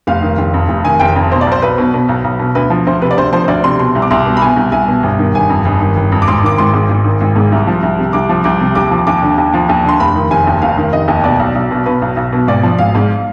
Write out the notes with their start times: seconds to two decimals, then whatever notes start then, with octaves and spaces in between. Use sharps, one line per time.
0.07 F1 F5
0.22 D#3
0.38 F1
0.54 F2
0.68 F1
0.85 D#3 G#5
1.00 F1 G5
1.16 F2
1.31 B2 C5
1.41 D5
1.47 B1 C5
1.62 B1 B4
1.78 B2
1.94 B2
2.09 B1
2.24 B1
2.39 B2
2.55 D2 B4
2.70 F3
2.87 D2 C5
3.01 C3 B4
3.11 D5
3.17 D2 C5
3.33 F3 C5
3.44 C5
3.48 D2 D5
3.64 C3 C6
3.79 B2 C6
3.95 C2
4.02 D6
4.11 C2 C6
4.26 B2
4.37 B5
4.42 B2 G#5
4.56 C2
4.72 C2 G#5
4.88 B2
5.03 G1
5.19 D#3
5.34 G1 G#5
5.50 F2
5.65 G1
5.81 D#3
5.96 G1
6.12 F2
6.22 D6
6.28 G#1 C6
6.43 D#3 D6
6.58 G#1 C6
6.73 G#2
6.89 G#1
7.05 D#3
7.21 G#1
7.36 G#2
7.52 C2
7.67 F3
7.83 C2
7.98 C3
8.13 C2 D6
8.29 F3
8.44 C2 D6
8.60 C3
8.75 D#2 D6
8.91 F3
9.07 D#2 D6
9.22 D3
9.38 D#2
9.54 F3
9.69 D#2
9.84 D3 C6
10.00 F1 B5
10.16 D#3
10.30 F1 G#5
10.47 D#2
10.62 F1 F5
10.77 D#3
10.93 F1 D#5
11.08 D#2
11.23 B2 D5
11.39 B1
11.55 B1
11.71 B2
11.86 B2 B4
12.02 B1
12.17 B1
12.32 B2
12.48 G#1 D5
12.63 F3
12.78 G#1 F5
12.95 G#2